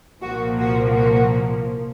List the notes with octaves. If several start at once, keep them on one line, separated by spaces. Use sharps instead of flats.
C2 A#2 F3 A#3 F#4
F#4
F#4